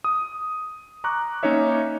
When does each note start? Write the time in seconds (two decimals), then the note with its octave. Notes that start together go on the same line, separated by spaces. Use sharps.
0.04 D#6
1.04 A#5 C#6 D6 F#6
1.43 A#3 C#4 D#4 A#4 C#5 E5